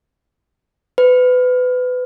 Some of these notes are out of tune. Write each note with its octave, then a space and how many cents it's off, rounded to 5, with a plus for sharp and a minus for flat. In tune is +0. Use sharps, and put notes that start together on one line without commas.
B4 +25